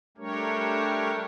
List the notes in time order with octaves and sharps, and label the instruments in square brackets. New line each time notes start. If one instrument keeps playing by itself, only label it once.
[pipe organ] G3 A3 D4 G4 A#4 C#5